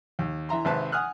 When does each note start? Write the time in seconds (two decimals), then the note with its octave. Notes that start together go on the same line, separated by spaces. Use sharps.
0.19 D#2
0.49 E3 E5 A#5 C6
0.65 G#1 C3 C4 B4 E5 A5
0.92 F#5 G#5 D#6 F6 F#6